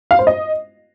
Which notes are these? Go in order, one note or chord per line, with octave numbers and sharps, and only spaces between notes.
F5
C5
D#5